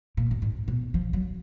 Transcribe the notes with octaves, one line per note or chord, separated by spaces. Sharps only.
A#2
F#2
G#2
B2
F3
F#3